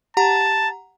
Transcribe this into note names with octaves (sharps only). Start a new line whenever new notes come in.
G4 F#5 A5 A#5